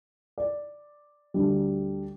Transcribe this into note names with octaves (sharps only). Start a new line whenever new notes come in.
D5
D2 D3 G3